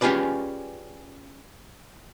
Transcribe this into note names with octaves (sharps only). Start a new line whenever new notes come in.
C#4 F4 G4 G#4 B4 D5